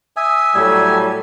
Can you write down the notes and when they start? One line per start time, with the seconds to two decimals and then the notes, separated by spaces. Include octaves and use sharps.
0.17 E5 G#5 D#6
0.55 A2 F#3 G3 A4 G#6